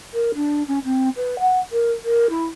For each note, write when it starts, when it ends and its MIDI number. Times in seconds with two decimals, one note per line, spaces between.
0.14 0.31 70
0.35 0.63 62
0.68 0.79 61
0.84 1.09 60
1.16 1.39 71
1.39 1.59 78
1.72 1.91 70
2.04 2.27 70
2.29 2.45 64